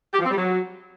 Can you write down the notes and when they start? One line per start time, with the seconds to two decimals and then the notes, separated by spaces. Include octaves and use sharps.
0.13 G4
0.19 F3
0.25 C4
0.31 G3
0.37 F#3